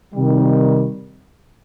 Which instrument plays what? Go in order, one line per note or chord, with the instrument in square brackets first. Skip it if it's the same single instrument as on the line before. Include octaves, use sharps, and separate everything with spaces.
[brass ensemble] C3 D#3 G3